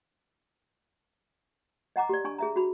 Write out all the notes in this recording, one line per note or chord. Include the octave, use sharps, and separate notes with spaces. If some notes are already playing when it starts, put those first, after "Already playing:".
D#5 F#5 A#5 D6
G4 D5
D4 G#5 A5 C#6
G#4 E5 A#5
F#4 B5